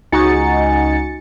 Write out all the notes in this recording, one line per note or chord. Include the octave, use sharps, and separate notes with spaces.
C#2 D#4 F#4 G#5 A6 C#7